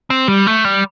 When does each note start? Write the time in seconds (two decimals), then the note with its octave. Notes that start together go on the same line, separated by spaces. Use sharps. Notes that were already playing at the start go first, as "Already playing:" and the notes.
0.10 C4
0.28 G3
0.47 A3
0.65 G3